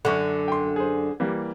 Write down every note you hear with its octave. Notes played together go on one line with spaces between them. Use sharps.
F#2 D3 F#5 C#6
G5 C6
G#4 C5
E3 G3 A#3